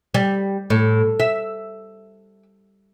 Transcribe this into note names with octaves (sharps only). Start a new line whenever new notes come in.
G3
A2
E5